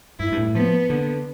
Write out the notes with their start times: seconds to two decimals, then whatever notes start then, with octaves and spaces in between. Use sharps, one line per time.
0.19 G2 E4
0.32 G2
0.37 A2
0.55 F3 B3
0.90 D3